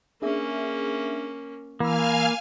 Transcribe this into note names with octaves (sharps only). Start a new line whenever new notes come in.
A#3 C#4 D4 G#4 E5
E3 A#3 F5 G#5 B5 E6 F6